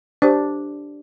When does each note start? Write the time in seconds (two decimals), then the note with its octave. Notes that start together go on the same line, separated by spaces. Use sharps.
0.22 D4 G4 C5